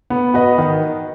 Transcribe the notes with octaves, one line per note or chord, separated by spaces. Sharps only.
B3
F#4 B4 D#5
D#3